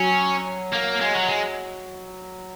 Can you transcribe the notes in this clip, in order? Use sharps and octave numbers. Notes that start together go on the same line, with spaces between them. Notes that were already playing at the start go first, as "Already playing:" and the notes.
Already playing: F#3 C#4
A#3
G#3
F#3
G#3